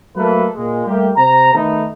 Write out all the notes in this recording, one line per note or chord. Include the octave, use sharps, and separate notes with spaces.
F#3 A3 A#3 A4 B4
A#2 G#3
G3 A3 A#3 G4
C3 C5 A#5
D#3 A3 B3 D#4 A4